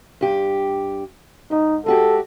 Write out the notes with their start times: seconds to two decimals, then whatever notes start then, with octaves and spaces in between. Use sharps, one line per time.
0.21 G2 G4
1.51 G#2 D#4
1.86 G#3 F#4 G4 A4